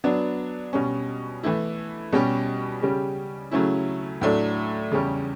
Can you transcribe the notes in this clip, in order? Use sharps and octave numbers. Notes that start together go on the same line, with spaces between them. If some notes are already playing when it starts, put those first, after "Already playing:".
F#3 B3 D4
B2 G3 C#4
E3 A3 E4
B2 G3 C#4 G4
C#3 G3 C#4 G4
C#3 F#3 A3 C#4 E4
A2 F#3 A3 D4
E2 C#3 G3 C#4 G4